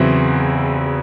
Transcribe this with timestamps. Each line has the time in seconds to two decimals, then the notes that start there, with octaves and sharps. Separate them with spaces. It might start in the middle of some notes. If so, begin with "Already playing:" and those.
Already playing: E2 C#3 F#3 C4 E4